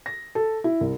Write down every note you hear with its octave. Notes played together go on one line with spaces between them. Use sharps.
A#6
A4
E4
C2